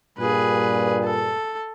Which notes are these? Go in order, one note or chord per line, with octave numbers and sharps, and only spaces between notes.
G2 A#2 G#4 B4
A4